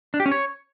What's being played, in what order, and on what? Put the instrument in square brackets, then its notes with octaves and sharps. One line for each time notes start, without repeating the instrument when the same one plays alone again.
[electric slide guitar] D4
G4
C#4
C#5